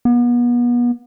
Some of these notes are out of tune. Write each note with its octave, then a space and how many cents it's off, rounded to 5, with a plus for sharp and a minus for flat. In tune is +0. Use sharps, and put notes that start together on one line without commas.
B3 -35